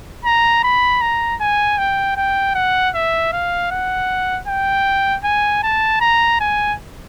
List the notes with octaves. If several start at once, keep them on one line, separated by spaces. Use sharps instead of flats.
A#5
B5
A#5
G#5
G5
G5
F#5
E5
F5
F#5
G5
G#5
A5
A#5
G#5